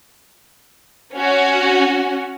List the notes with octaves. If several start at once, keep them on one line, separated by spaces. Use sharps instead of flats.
C#4 F#4